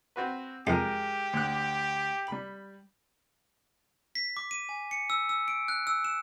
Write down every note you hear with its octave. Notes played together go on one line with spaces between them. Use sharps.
C4 F#4 B4
F2 G#3 G4 G#4 A#4
D2 F#6
G3 B5
B6
D6
D#7
G#5
C#7
E6
E6
D7
F#6
E6
E7